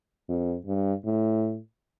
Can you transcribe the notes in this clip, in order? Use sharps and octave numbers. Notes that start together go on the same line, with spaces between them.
F2
G2
A2